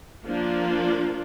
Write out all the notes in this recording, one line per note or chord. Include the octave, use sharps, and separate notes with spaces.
F3 A#3 D4 F4